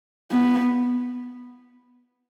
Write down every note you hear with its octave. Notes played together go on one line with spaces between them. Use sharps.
B3